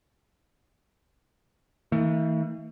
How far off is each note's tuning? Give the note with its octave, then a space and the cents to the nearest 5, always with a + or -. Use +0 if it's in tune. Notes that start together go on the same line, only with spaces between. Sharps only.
E3 -40 A3 +45